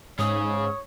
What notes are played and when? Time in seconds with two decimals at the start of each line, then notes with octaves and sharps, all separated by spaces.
0.19 G#2 C#4 G#4 C#5 D#6